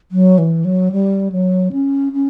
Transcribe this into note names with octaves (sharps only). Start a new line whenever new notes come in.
F#3
E3
F#3
G3
F#3
C#4
C#4